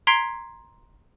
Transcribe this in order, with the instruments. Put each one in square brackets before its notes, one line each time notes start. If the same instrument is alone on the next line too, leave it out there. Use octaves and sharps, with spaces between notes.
[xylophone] A#5 C6 G#6 B6 C7 D7